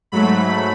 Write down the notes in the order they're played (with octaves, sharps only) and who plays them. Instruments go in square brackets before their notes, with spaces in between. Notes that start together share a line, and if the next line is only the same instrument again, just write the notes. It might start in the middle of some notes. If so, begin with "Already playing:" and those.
[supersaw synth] G#2 F#3 A3 B5